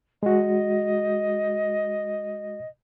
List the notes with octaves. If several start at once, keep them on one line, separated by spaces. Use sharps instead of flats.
G#3 F#4 D#5